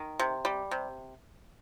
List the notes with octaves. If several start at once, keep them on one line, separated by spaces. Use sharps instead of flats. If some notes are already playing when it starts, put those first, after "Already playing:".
Already playing: D#3
C3
G3
C3